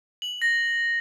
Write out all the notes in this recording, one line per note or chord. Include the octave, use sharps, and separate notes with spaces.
F#7
A#6